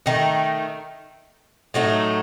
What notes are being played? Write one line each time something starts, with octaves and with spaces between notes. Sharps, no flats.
D#3 A3 D#4
A2 F#3 A3 D#4